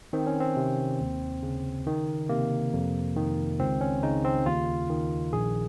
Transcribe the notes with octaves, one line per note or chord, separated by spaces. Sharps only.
D#3 C4
C#4
C4
C3
D#2
C#3
D#3
C3 A#3
F2
D#3
C#2 C4
C#4
C#3 D#4
C4
D#2 F4
D#3
A#1 G#4